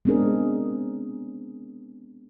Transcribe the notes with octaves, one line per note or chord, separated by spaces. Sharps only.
G#3 B3 C4 D4 G#4 A#4